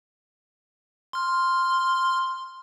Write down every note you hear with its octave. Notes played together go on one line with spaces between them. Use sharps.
C6 F6